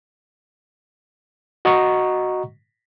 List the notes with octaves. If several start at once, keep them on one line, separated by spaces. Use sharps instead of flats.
F#4 D#5 F#5 A#5 C#6